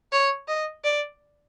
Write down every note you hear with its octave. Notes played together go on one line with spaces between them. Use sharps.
C#5
D#5
D5